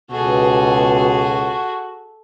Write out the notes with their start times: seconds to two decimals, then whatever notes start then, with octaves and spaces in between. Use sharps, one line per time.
0.11 C#2 B2 F#4 G#4 A4